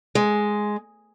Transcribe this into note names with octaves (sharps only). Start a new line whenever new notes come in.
G#3